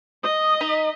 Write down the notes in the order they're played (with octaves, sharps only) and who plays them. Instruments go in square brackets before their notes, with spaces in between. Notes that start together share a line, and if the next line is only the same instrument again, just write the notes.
[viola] D#5 [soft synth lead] D#6
[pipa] D#4 [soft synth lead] B6